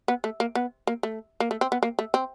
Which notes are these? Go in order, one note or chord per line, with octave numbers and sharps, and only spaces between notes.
B3
A3
A#3
B3
A#3
A3
A#3
A3
C4
B3
A#3
A3
C4